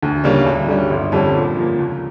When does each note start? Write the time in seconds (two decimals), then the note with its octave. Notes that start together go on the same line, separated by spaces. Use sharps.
0.02 D2
0.24 C#3 G3 A#3 C#4
0.46 D2
0.68 D3 G3 C#4
0.90 G1
1.12 F2 D3 G3 C#4
1.35 A#2
1.57 F3 A#3
1.79 C#2